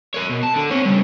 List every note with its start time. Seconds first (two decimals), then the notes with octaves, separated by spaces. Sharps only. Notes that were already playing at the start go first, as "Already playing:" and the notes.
0.15 A#4 C#5
0.30 B2
0.43 A5
0.56 D3
0.71 C4 C#5
0.85 C#3 G3